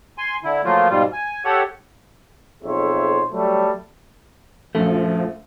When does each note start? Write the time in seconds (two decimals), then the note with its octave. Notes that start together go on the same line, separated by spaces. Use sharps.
0.18 G#5 C6
0.44 D3 E4
0.64 F3 F#3 A3 A#3 F4
0.90 G#2 B2 G3 F4
1.13 G#5
1.45 G4 A4 C#5 F#5
2.64 B1 F2 G#4 C5 C#5 E5
3.31 F#3 G3 A3
4.75 A#1 F#2 F3 A3